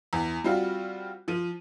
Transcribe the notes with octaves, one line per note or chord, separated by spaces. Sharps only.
E2
G3 C4 F4 F#4
F3 D#7